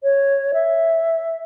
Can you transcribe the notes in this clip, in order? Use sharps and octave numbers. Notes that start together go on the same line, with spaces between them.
C#5
E5